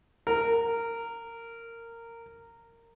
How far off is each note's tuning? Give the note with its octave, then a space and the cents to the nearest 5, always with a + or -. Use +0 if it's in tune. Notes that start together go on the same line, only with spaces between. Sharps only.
A#4 -15